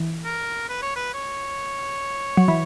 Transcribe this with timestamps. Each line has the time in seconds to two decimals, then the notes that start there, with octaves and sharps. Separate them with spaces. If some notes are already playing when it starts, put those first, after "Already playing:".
Already playing: E3
0.25 A#4
0.69 B4
0.82 C#5
0.96 B4
1.14 C#5
2.37 F#3
2.48 E3